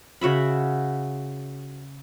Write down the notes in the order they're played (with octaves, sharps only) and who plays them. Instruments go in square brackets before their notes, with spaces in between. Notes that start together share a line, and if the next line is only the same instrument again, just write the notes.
[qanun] C#3 F#4 E5 B5